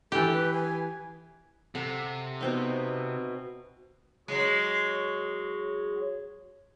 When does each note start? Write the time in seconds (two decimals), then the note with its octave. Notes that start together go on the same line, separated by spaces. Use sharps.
0.12 E3 G4 A4
0.33 B4
0.53 G#5
1.75 C3 A4 F#5
2.41 B2 C4 D#4
4.28 F#3 G#3 F#4 G#4 C#5